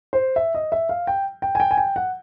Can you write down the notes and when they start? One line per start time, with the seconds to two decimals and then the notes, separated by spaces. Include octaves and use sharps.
0.13 C5
0.36 E5
0.55 D#5
0.72 E5
0.89 F5
1.07 G5
1.42 G5
1.55 G#5
1.60 G5
1.71 G#5
1.78 G5
1.96 F#5